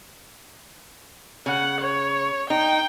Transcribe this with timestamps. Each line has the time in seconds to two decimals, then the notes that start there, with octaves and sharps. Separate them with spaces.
1.46 C#3 F#5
1.81 C#5
2.50 D#4 G5